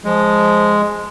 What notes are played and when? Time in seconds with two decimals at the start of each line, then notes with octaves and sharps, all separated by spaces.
0.04 F3 G#3